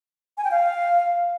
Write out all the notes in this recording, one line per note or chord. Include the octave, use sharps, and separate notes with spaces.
G#5
G5
F5